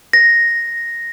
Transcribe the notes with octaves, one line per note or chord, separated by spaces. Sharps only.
A#6